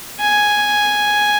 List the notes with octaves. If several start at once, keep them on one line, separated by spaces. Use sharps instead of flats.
G#5